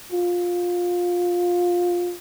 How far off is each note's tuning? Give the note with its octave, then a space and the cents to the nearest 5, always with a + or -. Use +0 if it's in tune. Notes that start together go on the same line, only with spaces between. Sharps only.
F4 +15